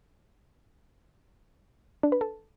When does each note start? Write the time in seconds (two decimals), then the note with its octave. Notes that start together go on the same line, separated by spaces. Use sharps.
2.03 D4
2.12 B4
2.21 A4